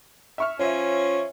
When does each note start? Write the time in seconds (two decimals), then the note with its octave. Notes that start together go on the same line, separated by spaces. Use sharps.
0.38 E5 C#6 F6
0.59 F3 C#4 C#5 E5